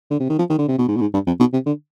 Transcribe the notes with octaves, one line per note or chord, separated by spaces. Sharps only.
D3
C3
D#3
F3
D#3
D3
C3
B2
G#2
B2
G#2
G2
F2
B2
C3
D3